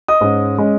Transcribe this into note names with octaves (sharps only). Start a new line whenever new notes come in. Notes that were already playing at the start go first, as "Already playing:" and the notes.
D#5 D#6
G#2 G#3 C#4
G#3 C#4